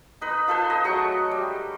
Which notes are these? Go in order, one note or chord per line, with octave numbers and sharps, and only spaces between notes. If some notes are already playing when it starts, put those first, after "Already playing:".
D#4 B4
F4 A4 B4 C5
D#5
F#3 G#3 A3 C#6
G3